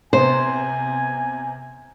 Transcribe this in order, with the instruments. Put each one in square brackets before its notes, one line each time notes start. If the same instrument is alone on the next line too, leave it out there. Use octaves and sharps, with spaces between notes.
[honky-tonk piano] C3 B3 [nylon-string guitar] C5 [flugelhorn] G#5